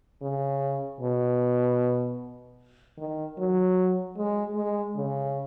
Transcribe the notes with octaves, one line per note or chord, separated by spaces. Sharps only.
C#3
B2
D#3
F#3
G#3
G#3
C#3